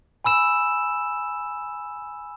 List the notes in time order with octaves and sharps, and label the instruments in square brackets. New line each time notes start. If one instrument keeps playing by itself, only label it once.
[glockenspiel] G#5 B5 E6 E7